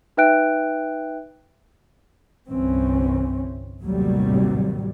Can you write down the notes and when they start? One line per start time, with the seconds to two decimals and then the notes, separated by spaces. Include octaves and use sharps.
0.17 D#4 B4 E5 G5 F#6 D7
2.50 G1 C2 E3 C4 C#4
3.83 A1 D#2 A2 C3 F#3 G3